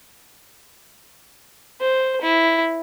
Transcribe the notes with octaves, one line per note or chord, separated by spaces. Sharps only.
C5
E4